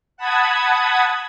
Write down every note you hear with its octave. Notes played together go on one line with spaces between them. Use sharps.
F#5 A5 B5 D#6 G#6